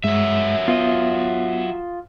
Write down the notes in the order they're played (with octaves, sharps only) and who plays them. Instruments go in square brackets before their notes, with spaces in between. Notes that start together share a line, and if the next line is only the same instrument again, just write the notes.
[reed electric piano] G2 G#3 [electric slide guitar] F#3 E5
[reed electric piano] B3 [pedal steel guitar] F4 D#5